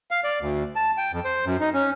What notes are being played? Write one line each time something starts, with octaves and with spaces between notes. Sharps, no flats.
F5
D5
D2
A5
G5
F2
C5
F#2
D#4
C#4